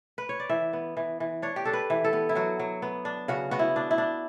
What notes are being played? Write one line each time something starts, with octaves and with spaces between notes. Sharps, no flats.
B4
C#5
D5
E3 E5
B3
E3
E3
D4 C#5
G4
D4 A4
B4
E3
A4
B3
E4
F#3 F#4
F#3
B3
D4
C#3 F#4
B3 F#4
E4
D4
E4
D4